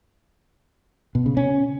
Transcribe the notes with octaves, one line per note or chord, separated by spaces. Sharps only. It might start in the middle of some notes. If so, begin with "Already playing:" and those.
B2
C#3
C#4